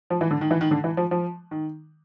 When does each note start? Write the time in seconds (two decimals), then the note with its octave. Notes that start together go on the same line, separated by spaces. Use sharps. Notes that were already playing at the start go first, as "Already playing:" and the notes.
0.10 F3
0.21 E3
0.31 D3
0.41 D#3
0.51 E3
0.61 D#3
0.71 D3
0.84 E3
0.97 F3
1.11 F3
1.51 D#3